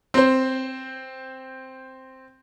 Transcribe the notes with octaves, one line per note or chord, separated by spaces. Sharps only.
C4 C5